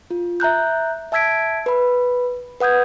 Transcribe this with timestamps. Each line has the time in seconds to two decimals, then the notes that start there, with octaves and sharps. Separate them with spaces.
0.11 F4
0.40 E5 A#5 F#6 G6
1.12 E5 A5 E6 G#6 B6 D7
1.66 B4 B5
2.60 B4 F#5 D#6 G6 G#6